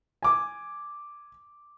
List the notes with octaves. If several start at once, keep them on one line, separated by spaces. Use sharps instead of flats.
G#5 D6